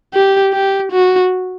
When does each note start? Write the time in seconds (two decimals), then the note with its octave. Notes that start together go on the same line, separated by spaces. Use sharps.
0.14 G4
0.53 G4
0.92 F#4